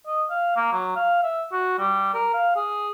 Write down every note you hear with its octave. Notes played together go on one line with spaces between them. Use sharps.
D#5
F5
A#3
F#3
F5
E5
F#4
G3
A#4
F5
G#4